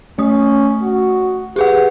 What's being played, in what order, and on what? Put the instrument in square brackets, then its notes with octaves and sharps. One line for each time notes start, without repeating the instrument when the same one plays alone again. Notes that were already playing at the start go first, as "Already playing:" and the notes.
[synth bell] A3 D#6 [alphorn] C#4
[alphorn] F#4
[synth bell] G4 G#4 F#5 [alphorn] B4